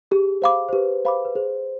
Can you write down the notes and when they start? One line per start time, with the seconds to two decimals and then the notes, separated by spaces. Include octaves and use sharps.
0.11 G4 G#4
0.42 C5 F5 B5 D6
0.69 C5
0.73 G4 B4
1.05 C5 F5 B5 D6
1.25 B4
1.35 G#4 C5